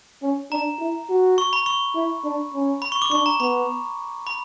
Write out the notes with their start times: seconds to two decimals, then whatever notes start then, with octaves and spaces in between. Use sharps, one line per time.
0.22 C#4
0.52 D4 A#5
0.80 E4
1.09 F#4
1.38 C#6
1.53 B5
1.66 C#6
1.95 E4
2.24 D4
2.54 C#4
2.82 B5
2.92 C#6
3.02 D6
3.11 D4 C#6
3.26 A#5
3.40 B3 B5
4.27 B5